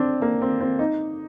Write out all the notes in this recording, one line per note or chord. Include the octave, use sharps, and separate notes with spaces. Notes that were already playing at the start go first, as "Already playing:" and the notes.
Already playing: C4 D4
A#3
C4
C4
D#4